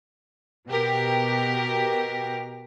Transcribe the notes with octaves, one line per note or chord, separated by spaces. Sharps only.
B2 G4 A#4